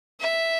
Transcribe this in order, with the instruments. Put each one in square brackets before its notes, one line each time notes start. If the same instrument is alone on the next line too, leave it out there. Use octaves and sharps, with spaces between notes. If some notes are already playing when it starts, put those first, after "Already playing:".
[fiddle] E5